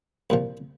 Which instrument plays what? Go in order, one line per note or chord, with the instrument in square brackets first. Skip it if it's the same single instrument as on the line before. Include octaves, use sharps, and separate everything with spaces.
[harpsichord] C2 A#2 F3